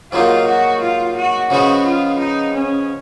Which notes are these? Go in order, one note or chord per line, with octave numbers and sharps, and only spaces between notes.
G#2 F#3 A#3 D#4 F4
F#4
F4
F#4
C#3 F3 G#3 B3 F#4
F4
D#4
C#4